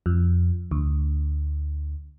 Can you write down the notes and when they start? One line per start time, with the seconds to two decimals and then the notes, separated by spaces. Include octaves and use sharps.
0.06 F2
0.71 D2